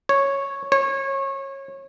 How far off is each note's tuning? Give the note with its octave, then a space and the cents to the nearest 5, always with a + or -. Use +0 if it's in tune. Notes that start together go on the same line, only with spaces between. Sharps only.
C#5 -5
C#5 -25